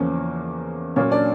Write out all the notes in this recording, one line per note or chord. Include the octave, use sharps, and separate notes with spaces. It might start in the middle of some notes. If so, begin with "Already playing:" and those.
Already playing: E2 C#3 F3 A#3 C#4 C#5
A#2 F#3 A#3 C#4 C#5
D4 D5